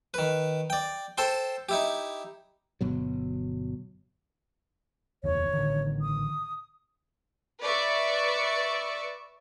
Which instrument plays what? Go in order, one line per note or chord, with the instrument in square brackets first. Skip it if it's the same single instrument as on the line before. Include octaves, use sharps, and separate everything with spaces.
[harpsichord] D#3 B4
D5 G5
A4 C5 G5 C6
D#4 E4 G4
[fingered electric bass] G1 B2 F#3
[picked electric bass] F1 D#2 [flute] C#5
[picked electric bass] A1 D3 D#3
[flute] D#6
[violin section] B4 D5 E5 C#6